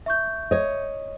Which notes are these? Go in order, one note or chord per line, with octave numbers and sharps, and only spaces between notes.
E5 C#6 G6
C#5 D#5